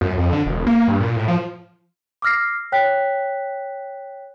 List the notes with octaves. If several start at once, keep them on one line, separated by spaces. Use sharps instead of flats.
F#2
F2
D3
E1
A#3
G2
A#2
A2
F3
D6 E6 F6 A#6 C7
C#5 G5 F#6 B6